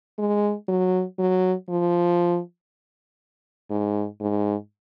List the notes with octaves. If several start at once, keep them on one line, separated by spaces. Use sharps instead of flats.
G#3
F#3
F#3
F3
G#2
G#2